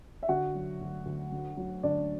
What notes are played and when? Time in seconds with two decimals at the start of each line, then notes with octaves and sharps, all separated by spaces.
0.23 E5
0.28 D3 F#4 F#5
0.55 F#3
0.81 D2
1.05 D2
1.32 D3
1.57 F#3
1.83 D2 D4 D5